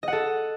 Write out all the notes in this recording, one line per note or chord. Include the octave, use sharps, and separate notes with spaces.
A4 D#5 F#5